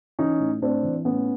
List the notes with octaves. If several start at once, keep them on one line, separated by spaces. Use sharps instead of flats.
E3 C#4 D#4
A2
A2 C4 D4
E3
A2 B3 C#4